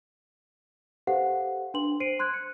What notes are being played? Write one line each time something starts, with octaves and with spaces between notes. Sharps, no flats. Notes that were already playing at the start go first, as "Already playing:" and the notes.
G4 A4 B4 C5 F5 F#5
D4 B4 C6 F#7
C5 C7 D7 D#7
C6 F#6 G#6
C#7